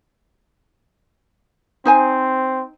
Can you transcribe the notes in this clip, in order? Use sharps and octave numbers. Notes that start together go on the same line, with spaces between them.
C4 D#4 C5 G#5